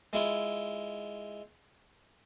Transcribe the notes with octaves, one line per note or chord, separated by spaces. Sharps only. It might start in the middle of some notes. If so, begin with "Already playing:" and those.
G#3 E4 F4